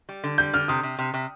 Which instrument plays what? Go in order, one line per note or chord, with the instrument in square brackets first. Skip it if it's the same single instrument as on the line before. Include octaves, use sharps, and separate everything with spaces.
[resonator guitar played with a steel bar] G3
D3
[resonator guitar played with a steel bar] G3 [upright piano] G6
[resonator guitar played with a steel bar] D3 [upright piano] F6
[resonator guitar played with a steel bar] C3 [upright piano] D#6
[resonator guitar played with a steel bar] C3
C3
C3